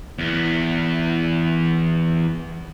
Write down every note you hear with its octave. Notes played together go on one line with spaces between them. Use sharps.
E2 B3